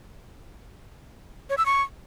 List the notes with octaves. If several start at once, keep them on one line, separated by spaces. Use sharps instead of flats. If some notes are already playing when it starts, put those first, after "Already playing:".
C#5
E6
C#6